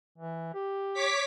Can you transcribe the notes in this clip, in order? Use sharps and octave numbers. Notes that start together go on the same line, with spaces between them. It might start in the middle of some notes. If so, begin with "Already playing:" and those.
E3
G4
C#5 D6 B6